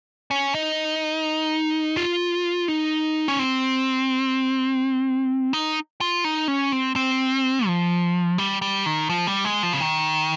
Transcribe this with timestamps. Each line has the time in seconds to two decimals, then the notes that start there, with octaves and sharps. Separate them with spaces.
0.31 C#4
0.55 D#4
1.97 F4
2.68 D#4
3.28 C#4
3.39 C4
5.53 D#4
6.01 F4
6.24 D#4
6.48 C#4
6.72 C4
6.96 C4
7.67 F3
8.38 G3
8.62 G3
8.86 D#3
9.09 F3
9.27 G3
9.45 G#3
9.63 F3
9.73 C#3
9.81 D#3